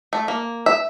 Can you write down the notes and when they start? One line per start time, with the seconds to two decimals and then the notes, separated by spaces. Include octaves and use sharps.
0.13 A3
0.28 A#3
0.66 E5